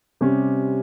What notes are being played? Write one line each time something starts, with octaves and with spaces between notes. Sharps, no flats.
C3 G3 C#4